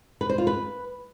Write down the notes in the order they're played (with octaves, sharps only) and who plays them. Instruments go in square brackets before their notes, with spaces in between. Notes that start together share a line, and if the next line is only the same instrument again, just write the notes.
[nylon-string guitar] B4
C5
F4
B4